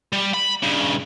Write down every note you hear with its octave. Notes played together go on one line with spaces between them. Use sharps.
G3
B5
G2 C#3